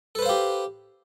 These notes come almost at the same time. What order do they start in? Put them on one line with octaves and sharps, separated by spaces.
A4 B4 C5 F5 G4